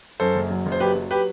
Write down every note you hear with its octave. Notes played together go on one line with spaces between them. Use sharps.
F#2 A4 C5
F#1
F#3
F#1
C5
F#3 G4 B4
F#3
G4 B4